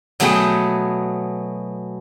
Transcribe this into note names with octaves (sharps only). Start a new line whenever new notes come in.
B2 F#3 A3 B3 G#4 G5